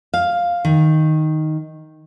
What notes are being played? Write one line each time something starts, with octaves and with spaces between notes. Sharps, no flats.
F5
D#3